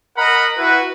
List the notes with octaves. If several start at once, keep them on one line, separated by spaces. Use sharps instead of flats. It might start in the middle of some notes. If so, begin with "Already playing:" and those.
A#4 D#5 F#5 A#5 B5
E4 F#4 B4